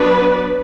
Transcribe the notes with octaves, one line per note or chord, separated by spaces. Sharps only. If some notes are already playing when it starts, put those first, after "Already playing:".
Already playing: F#3 B3 D4 B4